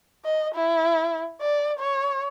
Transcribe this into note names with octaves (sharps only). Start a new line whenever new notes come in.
D#5
E4
D5
C#5